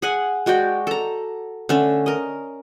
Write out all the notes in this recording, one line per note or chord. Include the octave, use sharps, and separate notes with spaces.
G#4 F#5 G#5
G#3 F#4 D5 G5
A4 A#5
D3 A3 C#4
A#4 D#5